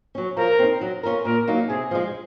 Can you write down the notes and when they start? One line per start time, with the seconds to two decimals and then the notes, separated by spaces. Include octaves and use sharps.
0.15 F#3 C#4
0.37 F3 A#4
0.59 C4 D#4
0.81 F#3
1.03 C#4 F4 A#4
1.25 A#2 A#4
1.48 F#3 A#3 D#4
1.69 C3 G#4
1.91 F3 G#3